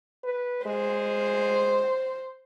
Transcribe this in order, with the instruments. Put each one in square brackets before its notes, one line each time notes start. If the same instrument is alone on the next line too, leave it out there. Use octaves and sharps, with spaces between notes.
[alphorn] B4
[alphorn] G#3 [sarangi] C5